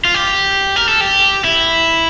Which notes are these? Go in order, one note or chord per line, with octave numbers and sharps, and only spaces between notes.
F4
G4
A#4
A4
G4
E4